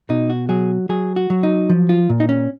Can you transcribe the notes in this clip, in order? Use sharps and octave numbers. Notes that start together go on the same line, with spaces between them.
B2 D#4
F#4
F#3 G#4
F#3 G#4
F#4
F#3
D#4
F3
F4
A#2
D#4
C#4